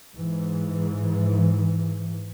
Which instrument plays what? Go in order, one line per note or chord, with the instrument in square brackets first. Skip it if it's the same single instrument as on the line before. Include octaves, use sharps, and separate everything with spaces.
[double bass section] G#2 E3